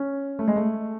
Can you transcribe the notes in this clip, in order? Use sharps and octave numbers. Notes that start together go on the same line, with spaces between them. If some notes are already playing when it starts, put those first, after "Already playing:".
Already playing: C#4
A3
G#3
A3